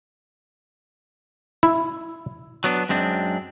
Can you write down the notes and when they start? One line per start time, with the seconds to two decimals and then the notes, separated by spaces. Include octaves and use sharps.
1.63 E4
2.64 F#3 B3 D4
2.89 F#2 G#3 C4 D4